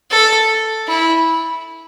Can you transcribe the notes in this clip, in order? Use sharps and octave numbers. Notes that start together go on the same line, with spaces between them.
A4
E4